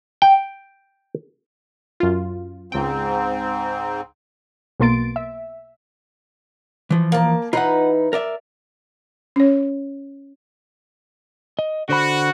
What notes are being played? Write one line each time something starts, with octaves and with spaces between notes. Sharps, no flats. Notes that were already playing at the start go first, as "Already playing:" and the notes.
G5
F#2 F4
C#2 G#2 C4 G5
B1 B2 A#3 C6 A6 D7
E5
E3 F3
A#3 A5
E3 D#4 F4 B4 F#5
A#4 D5 E5
C#4 C#5
D#5
D3 F#4 C5 B5